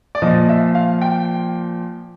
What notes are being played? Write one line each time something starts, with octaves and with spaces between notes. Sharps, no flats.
D5
A#2 F3 D#5
E5
F5
G5